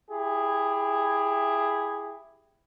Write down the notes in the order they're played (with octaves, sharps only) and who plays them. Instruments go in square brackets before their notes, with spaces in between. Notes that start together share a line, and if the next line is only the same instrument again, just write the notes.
[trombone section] E4 G4 G#4